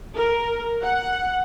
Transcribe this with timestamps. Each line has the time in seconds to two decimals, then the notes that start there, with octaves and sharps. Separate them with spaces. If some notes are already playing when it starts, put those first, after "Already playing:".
0.15 A#4
0.83 F#5